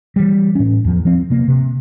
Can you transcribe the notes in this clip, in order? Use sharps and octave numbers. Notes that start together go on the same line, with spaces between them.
E3 G3
A2 C#4
E2 F3
F3 C4
C3 A#3
C3